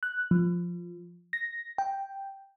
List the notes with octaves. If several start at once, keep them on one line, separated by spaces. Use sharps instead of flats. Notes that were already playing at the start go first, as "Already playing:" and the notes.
F#6
F3
A#6
G5